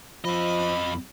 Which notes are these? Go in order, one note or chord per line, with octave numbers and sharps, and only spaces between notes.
F2 F3 D#5 B5